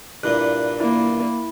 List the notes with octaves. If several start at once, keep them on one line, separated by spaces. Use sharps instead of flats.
G2 A#2 E4 F#6
A#3 E4